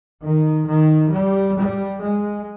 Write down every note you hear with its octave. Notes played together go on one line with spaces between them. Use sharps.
D#3
D#3
G3
G3
G#3